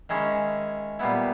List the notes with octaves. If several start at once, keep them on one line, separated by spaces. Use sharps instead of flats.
D#3 G#3 C#4 E4 D#5
A#2 G3 B3 E4